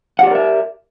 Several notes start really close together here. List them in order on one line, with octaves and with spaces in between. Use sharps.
F#5 G4 D5 A#4 E5